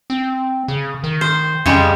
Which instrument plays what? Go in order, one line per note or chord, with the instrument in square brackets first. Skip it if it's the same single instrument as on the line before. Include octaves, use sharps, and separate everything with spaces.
[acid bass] C4
C#3
D#3
[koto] C5
[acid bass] F2 [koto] C#3 G3 G#3